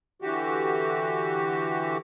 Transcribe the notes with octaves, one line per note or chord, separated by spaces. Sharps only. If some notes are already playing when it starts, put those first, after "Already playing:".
D3 E3 F#4 G4